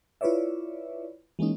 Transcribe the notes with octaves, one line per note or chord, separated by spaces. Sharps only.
E4 F4 B4 C#5 D5 E5
E3 G#3 A#3 C#4 D#4